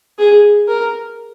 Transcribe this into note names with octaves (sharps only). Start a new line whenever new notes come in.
G#4
A#4